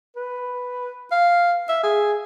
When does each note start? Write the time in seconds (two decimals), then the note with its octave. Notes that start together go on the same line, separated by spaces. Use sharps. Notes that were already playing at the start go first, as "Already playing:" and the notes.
0.17 B4
1.12 F5
1.69 E5
1.83 G#4